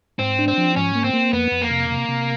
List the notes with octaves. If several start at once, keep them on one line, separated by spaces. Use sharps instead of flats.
G#2 C4
D4
C4
F3
G#2 C#4
A#3
C4
A#3
F2 B3
F2
A#3
C3
C3
C3